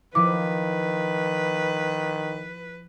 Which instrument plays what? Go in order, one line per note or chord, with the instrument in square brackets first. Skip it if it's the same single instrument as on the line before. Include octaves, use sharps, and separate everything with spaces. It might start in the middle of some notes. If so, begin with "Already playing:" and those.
[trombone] D#3 [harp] F3 E4 [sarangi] B4 [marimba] D6